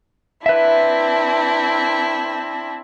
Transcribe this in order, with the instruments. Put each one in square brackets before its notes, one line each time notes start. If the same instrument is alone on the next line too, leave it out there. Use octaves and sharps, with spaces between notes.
[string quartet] C4 D4 E4 [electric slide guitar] B4 E5